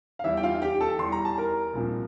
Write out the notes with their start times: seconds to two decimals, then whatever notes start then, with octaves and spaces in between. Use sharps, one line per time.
0.19 F5
0.24 E2 E3 G3 E4 E5
0.37 G5
0.43 F4 F5
0.62 G4 G5
0.81 A4 A5
0.99 E2 E3 G3 C6
1.12 A#5
1.25 A5
1.38 A#4 A#5
1.73 C2 A#2 F3